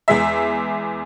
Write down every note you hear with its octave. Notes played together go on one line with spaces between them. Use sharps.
E2 G#3 E5